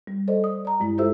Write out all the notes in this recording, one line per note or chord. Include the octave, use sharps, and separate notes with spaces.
G3
A4 C5 D5 D#5
D#6
D5 A#5
G2 G#3 E4
F4 G4 A4 C5 E5 E6